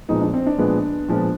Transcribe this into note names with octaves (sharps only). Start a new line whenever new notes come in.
A#2 F3 G#3 B3 D#4
D4
C4
D4
A#2 F3 G#3 B3
A#2 F3 G#3 B3